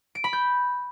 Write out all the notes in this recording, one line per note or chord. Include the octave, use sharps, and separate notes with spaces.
D7
B5
G6